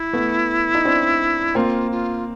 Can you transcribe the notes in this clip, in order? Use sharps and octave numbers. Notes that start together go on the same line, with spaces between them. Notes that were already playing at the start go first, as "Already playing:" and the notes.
Already playing: E4
A3 B3
D#4
C4 D4
A#3 C4 F4
F4